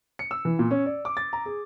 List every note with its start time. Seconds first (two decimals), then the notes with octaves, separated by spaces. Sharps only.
0.19 C#7
0.31 E6
0.45 E3
0.59 A#2
0.71 C#4
0.86 D5
1.05 D6
1.17 A6
1.33 A#5
1.46 G#4